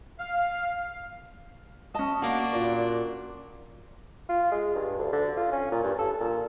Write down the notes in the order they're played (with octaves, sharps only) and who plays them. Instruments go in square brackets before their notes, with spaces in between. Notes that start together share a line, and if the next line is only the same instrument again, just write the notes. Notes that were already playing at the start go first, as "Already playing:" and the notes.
[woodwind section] F5
[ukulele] C#4 A5 [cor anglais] D#5
[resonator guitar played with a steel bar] A#3 F#4 [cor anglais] D4
[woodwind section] A#2
[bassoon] F4
G#3
G2
D2
D3
F4
C#4
A#2
G2
A4
A#2